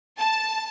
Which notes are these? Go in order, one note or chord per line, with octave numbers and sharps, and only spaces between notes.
A5